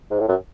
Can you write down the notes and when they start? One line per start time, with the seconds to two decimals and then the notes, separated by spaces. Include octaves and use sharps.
0.10 G#2
0.20 A2
0.28 F#2